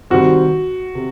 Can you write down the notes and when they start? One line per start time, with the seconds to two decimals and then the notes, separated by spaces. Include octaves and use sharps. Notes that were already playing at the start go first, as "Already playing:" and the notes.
0.10 C3 D#3 G3 C4 F#4
0.95 C3